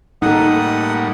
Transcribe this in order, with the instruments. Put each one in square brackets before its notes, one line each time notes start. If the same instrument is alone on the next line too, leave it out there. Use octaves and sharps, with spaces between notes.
[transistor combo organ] A2 G3 A#3 [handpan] D#4 A4 [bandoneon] F#5 D#6